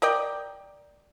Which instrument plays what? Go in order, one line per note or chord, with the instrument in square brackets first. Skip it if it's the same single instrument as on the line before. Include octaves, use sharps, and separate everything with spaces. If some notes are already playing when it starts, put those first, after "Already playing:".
[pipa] A#4 D5 D#5 G5